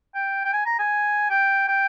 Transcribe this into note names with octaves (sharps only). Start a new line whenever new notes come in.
G5
G5
G#5
A#5
G#5
G5
G5